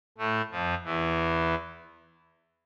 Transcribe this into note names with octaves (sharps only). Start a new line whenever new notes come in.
A2 A3
F2 F3
E2 E3